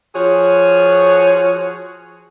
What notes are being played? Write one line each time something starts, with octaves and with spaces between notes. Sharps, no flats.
F3 F#4 G#4 C#5